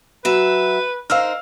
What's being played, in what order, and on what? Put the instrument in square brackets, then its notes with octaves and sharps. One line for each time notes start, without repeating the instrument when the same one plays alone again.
[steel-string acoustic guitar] F#3 E5 [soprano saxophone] B4
[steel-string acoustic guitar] D#4 A#4 C5 [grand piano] F5 E6 F6